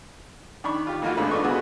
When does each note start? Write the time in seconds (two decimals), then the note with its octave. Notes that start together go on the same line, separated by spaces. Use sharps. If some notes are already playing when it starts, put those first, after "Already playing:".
0.64 D#3 D4 B5 C#6
0.87 F4 G4
1.02 E3 A3 A#3 D#4 F4 F#4
1.17 G#1 D3 G#3 B4
1.31 D4 F4 D5 D#5 C#6
1.43 D2 D3 B3 F#4 G#4 B4